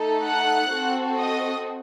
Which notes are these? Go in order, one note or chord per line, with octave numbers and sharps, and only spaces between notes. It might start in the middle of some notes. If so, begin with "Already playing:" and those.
Already playing: A3 D#4 A4
F#5 F#6
C4 F#4 A4
D#5 D#6